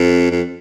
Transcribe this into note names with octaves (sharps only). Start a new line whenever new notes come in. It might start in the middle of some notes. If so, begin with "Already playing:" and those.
Already playing: F2
F2